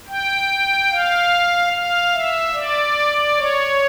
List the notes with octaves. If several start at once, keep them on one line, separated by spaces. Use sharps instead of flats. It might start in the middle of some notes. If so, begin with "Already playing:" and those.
G5
F5
F5
E5
D5
C#5